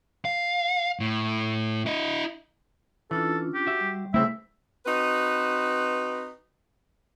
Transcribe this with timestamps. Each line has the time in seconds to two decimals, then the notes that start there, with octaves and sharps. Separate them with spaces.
0.25 F5
1.00 A2
1.86 E4 D#5
3.11 E3 C#4 D4 F4 A4
3.54 G4
3.67 F#4 E5
3.81 G3
4.14 C#3 A3 C4 E4 E5
4.86 C4 D#4 F#4 B4